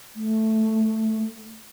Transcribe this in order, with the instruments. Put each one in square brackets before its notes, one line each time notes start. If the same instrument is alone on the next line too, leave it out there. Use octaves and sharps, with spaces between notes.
[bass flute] A3